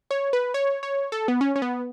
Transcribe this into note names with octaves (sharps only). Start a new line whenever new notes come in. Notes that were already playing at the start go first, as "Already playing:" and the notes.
C#5
B4
C#5
C#5
A4
B3
C#4
C#4
B3